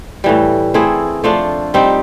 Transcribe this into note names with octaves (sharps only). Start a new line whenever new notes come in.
A2 E3 G3
A3 C4 E4 G#4
F3 A3 D4 F4
G3 C4 D#4 G4